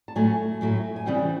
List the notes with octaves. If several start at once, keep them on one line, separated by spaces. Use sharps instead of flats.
A5
A2 F#3 A3 G#5
A2 F#3 A3
G#5
C#3 E3 G3 C4 G5